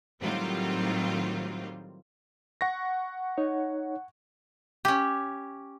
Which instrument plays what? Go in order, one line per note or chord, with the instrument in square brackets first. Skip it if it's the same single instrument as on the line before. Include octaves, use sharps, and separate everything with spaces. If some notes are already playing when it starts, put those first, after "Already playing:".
[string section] A2 D#3 F#3 G3 C4 F4
[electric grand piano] F#5 C#6 A#6
[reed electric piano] D#4 C#5
[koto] C#4 G4